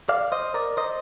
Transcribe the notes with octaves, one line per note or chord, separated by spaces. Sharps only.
D5 F5
C5 D#5
A#4 D5
C5 D#5